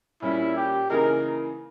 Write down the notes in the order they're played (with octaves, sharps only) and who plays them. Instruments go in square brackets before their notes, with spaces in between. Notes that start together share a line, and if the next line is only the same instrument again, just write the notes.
[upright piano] A#2 G3 C#4 [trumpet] E4
[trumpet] G4
[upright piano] C#3 E3 A#3 D#4 G#4 [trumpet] A#4